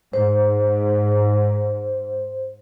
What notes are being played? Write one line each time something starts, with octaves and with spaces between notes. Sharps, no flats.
G#2 C5